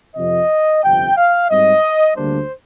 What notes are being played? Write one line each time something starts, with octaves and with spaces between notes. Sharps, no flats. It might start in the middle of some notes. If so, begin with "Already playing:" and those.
F2 C3 F3 D#5
G1 F2 C3 G5
F5
G#2 G3 C4 D#5
D2 D3 G3 A#3 D4 C5